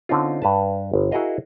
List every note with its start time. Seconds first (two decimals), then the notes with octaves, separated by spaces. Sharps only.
0.09 D3 C4 C#4 D#4 F4
0.42 G2 B4 A5
0.93 G1
1.12 E4 F#4 G#4 A#4 D#5 F5